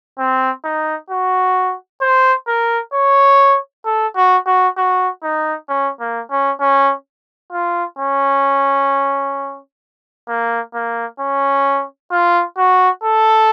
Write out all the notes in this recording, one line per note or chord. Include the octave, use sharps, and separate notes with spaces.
C4
D#4
F#4
C5
A#4
C#5
A4
F#4
F#4
F#4
D#4
C#4
A#3
C#4
C#4
F4
C#4
A#3
A#3
C#4
F4
F#4
A4